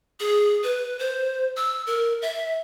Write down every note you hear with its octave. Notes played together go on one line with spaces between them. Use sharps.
G#4
B4
C5
E6
A#4
E5